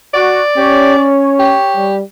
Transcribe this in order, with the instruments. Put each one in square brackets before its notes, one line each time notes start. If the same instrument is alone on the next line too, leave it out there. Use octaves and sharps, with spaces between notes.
[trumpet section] F#4 [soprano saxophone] D5
[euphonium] C#4 [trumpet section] G4 C#5
[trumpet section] C#5
[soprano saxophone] G4
[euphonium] G3